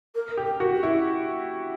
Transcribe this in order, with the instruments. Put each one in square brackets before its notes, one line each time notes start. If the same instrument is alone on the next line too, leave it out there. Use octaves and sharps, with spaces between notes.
[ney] A#4
[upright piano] G4
[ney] A#4
[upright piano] F#4
[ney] G4
[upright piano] E4